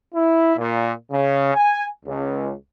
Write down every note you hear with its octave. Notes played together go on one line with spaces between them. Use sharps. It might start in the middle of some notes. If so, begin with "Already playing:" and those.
E4
A#2
C#3
G#5
C#2